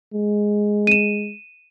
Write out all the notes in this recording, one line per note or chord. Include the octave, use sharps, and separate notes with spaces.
G#3
D#7 E7